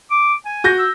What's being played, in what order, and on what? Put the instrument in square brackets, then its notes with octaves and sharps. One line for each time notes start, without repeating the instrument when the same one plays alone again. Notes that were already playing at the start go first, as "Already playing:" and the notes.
[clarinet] D6
G#5
[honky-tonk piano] F#4 G6 A#6
[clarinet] E6